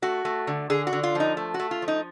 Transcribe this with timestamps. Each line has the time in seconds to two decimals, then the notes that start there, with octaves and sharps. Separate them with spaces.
0.02 A3 F#4
0.25 A3
0.47 D3
0.70 D3 G#4
0.87 F#4
0.93 D3
1.03 F4
1.15 F3 D#4
1.37 A3
1.54 F#4
1.59 A3
1.71 F4
1.82 F3
1.88 D#4